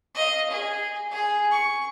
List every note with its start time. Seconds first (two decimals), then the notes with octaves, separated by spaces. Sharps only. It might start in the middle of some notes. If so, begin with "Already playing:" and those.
0.15 D#5 F5
0.50 G#4
1.11 G#4
1.50 C#6